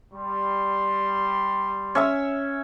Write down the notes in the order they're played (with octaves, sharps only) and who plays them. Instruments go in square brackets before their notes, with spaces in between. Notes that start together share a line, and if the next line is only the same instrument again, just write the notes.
[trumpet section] G3 C6
[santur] C#4 E5 E6